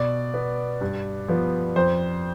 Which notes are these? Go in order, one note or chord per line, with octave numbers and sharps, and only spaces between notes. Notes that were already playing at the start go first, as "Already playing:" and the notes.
Already playing: B2 D5
B3
G2
F3 B3
F2 C5